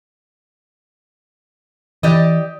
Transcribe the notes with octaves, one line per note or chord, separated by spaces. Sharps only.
E3 G4 D5 D#5